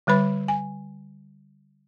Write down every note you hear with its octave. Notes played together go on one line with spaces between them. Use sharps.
D3 G3 B4 B5
G#5